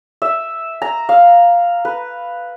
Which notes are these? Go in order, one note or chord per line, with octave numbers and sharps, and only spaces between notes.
E5
A#5
F5
B4